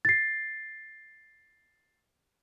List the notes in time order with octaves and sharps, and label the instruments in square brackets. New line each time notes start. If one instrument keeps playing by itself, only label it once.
[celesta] A6 C7